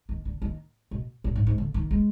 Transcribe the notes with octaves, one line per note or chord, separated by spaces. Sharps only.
D#3
D3
D#3
B2
A#2
G#2
G#2
D3
D#3
G#3